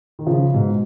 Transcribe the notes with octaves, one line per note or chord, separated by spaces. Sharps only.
D#3
C#3 F3
G#2 B2